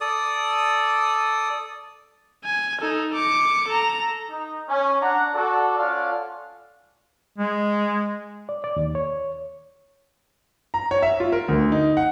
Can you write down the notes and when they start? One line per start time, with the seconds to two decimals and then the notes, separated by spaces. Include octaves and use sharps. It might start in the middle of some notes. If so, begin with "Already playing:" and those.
0.01 A4 D5 D#6
2.45 G#5
2.81 D#4 A4
3.13 D6 C#7
3.68 A4 A#5
4.30 D#4
4.69 C#4
5.01 D4 F#5 A#5
5.33 F#4 A4 D5
5.78 C#4 F4 A4 D5 F5 F#5
7.38 G#3
8.49 D5
8.64 D5
8.76 D#2
8.95 C#5
10.74 A#5
10.91 C#5
11.02 E5
11.20 F4
11.32 A#4
11.48 D2
11.72 D#4
11.97 F#5